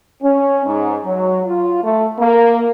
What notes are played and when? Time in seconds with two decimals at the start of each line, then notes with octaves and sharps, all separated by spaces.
0.22 C#4
0.66 G#2
1.05 F#3
1.46 F4
1.83 A3
2.19 A#3